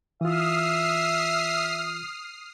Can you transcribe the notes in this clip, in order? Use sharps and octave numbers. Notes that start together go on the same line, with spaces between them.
E3 F4 E5 D#6 F6 C7